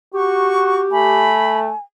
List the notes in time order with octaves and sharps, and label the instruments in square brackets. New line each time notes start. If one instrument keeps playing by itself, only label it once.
[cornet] F#4 [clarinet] G4 [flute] C#6
[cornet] A3 [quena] G#5 [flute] B5